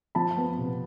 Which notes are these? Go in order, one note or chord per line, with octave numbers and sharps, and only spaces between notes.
F3 A5 B5
B3
C3